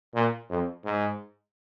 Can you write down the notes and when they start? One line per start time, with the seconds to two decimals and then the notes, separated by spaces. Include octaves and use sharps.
0.15 A#2
0.50 F2
0.85 G#2